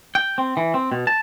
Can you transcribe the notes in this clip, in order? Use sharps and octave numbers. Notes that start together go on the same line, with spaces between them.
G5
C4
E3
C4
B2
A5